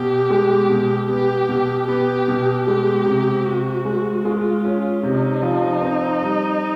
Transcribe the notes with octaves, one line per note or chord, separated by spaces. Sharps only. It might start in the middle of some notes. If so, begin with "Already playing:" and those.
Already playing: B2 G4
G#3
B2
B3 G4
B2
B3 G4
B2
G#3 G4
C3
C3 F#4
G#3
G#3 F4
C#4
C3 D#4
F3
C4
G3